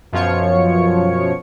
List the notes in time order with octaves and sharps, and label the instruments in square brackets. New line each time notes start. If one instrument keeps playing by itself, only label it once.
[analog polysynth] F#2 B2 F3 F4 C#5 C#7